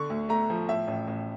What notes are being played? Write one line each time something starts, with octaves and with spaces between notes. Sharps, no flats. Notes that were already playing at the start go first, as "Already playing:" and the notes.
Already playing: D3 C#6
D2
A3 A#5
F3
A2 E5
A1
A1